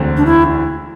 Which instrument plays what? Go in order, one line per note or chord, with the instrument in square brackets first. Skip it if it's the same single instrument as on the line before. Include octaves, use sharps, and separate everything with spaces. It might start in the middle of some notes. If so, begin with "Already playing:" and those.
Already playing: [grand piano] E1 D2 D3 C4
[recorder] D4
E4